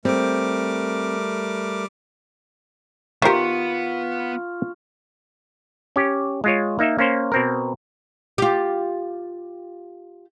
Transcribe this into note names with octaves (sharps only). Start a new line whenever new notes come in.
G3 A3 C4 A#4 D6
D#3 B3 F4 G4 A#4 C5 E5 C#6
C#4 G4
G#3 F4 C#5
A#3 D#4 E5
A#3 C#4 C5
B2 C4 A#4
F4 G4